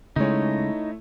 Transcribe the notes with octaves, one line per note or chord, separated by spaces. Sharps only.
C#3 G#3 A3 D#4 E4 C#5